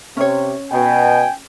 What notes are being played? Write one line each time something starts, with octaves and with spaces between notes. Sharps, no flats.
C3 C#4 C#5
B2 G5 G#5